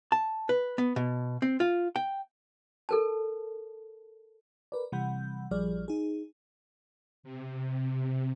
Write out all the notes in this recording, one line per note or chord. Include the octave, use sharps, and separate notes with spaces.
A5
B4
B3
B2
C4
F4
G5
A4 A#4 A5
A#4 B4 D5
C3 E3 G3 F#5 B5 G6
A#1 F3 G3 G#4 D5 F6
D#4 G#4
C3